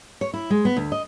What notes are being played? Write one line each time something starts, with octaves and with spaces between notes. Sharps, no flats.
C#5
E4
G#3
B3
D2
D#5